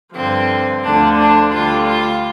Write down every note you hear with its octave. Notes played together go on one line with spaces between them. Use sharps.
G2 D3 F3 C4
D2 D3 F3 D4
D4
D2 D3 G3 F4
F4